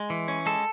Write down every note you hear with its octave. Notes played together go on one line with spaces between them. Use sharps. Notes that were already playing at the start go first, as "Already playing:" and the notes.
Already playing: G#3
E3
C#4
G#3 A4